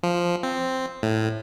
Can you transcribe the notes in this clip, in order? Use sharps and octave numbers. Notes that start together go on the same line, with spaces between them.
F3
C4
A2